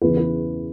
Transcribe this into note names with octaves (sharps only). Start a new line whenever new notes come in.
E2 C#3 E3 B4
B4